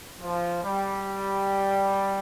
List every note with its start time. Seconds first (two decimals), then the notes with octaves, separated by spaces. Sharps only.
0.21 F3
0.64 G3